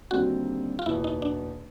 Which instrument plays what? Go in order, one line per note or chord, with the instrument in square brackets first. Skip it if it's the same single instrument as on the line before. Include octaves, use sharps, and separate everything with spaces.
[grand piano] D#2 D3 G3 C4 D#4 [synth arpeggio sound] F#4
[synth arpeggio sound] F4
[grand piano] F#1 E2 B2 [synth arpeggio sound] E4
[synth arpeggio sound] D#4
D4